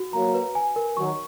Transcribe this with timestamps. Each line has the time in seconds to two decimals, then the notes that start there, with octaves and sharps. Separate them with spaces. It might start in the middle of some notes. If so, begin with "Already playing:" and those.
Already playing: F#4
0.13 F#3 A#3 A#5
0.34 B4
0.55 G#5
0.76 A#4
0.97 D#3 F#3 C#6